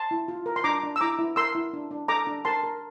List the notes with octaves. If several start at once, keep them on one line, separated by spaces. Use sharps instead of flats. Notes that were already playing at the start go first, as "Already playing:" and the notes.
Already playing: A5 C6
E4
F4
A#4
C6
D4 A#5 D6
D4
E6
E4 A#5 D6
E4
A#4 C6 E6
E4
D4
D4
A4 A#5 D6
D4
A#4 A5 C6
A#4